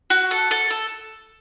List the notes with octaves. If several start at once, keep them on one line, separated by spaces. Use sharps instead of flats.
F#4
A4
A4
A4